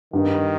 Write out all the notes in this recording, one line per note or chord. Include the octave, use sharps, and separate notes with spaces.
G2 D#3